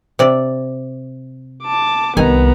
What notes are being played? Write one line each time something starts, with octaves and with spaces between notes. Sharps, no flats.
C3 D5
A5 D6
C2 D#3 B3 G#5 A#5